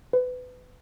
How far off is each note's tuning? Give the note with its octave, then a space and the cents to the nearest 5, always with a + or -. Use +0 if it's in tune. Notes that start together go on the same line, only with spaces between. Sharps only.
B4 +25